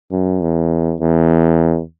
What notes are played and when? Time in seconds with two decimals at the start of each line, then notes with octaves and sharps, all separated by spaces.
0.12 F#2
0.41 E2
1.01 E2